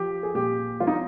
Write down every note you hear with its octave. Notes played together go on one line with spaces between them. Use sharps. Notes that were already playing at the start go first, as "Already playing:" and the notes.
Already playing: F3 G4
G#4
A#2 G4
F3 F4
D#4